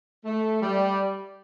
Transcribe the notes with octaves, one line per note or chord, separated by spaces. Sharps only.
A3
G3